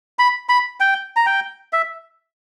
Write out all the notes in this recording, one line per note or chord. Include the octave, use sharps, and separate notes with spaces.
B5
B5
G5
A#5
G5
E5